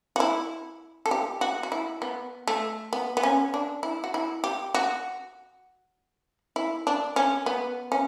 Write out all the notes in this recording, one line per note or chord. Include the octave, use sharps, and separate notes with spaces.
F#4
E4
A4
G4
F#4
F#4
E4
B3
A3
B3
B3
C#4
D4
E4
F#4
E4
G4
F#4
E4
D4
C#4
B3
C#4